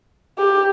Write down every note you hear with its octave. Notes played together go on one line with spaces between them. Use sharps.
G4